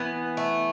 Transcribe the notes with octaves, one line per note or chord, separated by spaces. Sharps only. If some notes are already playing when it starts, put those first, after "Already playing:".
Already playing: E3 B3
A3